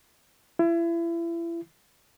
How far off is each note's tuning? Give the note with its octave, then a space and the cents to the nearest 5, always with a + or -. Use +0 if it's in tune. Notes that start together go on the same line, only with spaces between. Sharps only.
E4 +35